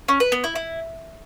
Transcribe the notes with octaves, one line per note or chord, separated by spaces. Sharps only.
C#4
B4
B3
E4
E4